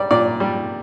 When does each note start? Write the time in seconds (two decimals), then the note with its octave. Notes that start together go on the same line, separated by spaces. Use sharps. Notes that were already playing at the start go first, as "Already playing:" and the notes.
Already playing: G3 D5
0.11 A#2 D5
0.40 G3